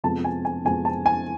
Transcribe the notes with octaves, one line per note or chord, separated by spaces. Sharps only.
F2 C3 F3 G#3 B3 A5
G#5
G#5
F2 C3 F3 G#3 B3 G#5
A5
G#5